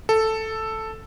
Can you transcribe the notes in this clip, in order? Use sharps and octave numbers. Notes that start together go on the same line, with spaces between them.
A4